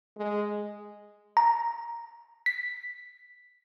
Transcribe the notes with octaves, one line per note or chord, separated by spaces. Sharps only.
G#3
A#5
B6